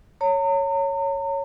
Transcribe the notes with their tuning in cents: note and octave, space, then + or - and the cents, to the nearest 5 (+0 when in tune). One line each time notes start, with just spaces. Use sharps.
C#5 +0 A#5 -40